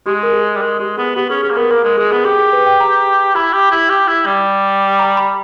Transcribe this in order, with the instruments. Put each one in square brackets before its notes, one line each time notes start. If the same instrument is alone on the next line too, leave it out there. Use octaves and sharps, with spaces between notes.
[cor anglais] G#3 [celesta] G4
[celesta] A#4
G#4
[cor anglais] G3
[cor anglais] G#3 [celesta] A#4
[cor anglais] G#3 [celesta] G4
[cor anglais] B3 [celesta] G#4
[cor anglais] B3 [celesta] G4
[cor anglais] C#4 [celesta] G#4
[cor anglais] C#4 [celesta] G#4
[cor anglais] A#3
[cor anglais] B3 [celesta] A#4
[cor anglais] A#3 [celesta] A#4
[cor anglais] G#3 [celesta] A#4
[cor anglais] G#3 [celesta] G#4
[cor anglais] B3 [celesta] G#4
[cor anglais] G4 [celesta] G#4
[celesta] G#4
B4
G5
A#5
[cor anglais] E4 [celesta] B5
[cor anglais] G4
E4
G4
E4
G3
[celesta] A#5
B5